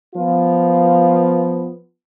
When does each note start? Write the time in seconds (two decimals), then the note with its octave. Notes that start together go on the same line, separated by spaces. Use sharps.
0.15 F3 B3 F4